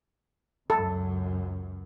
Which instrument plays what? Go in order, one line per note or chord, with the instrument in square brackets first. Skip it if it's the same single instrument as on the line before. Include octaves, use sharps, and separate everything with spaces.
[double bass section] C#2 F#2 [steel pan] A4